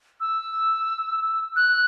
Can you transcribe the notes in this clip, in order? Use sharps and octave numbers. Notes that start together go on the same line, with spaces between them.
E6
F#6